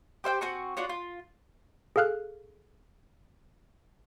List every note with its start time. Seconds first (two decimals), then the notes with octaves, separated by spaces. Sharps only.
0.24 G4 C5 F5 G5
0.41 C4 F#4 G#5 C#6
0.77 D4 F4 F#4 C#5
0.89 F4
1.96 G#4 A4 F5 F6 F#6